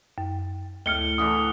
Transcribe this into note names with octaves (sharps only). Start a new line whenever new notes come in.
F#2
D2 A2 F6 C#7 G7
D3 E3 D4 D#6